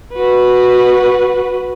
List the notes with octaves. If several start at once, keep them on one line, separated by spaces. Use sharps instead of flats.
F#4 B4